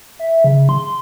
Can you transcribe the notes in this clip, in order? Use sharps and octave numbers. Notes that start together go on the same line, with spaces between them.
E5
C#3
C6